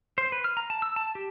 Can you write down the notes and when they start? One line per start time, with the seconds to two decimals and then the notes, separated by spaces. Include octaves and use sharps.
0.18 C5
0.32 B4
0.44 F6
0.57 A#5
0.70 A5
0.82 E6
0.96 A5
1.15 G4